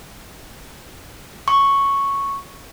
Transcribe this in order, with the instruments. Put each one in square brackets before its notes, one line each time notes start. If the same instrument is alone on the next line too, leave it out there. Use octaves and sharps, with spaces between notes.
[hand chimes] C#6